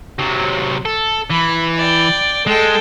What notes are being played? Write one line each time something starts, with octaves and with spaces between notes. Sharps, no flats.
C3 F#3
A4
E3 B5
D5 G5
G#3 A4 G5